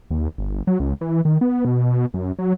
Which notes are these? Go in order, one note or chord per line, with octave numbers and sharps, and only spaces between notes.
D#2
G1
F#3
C#2
E3
D#3
B3
B2
F#2
F#3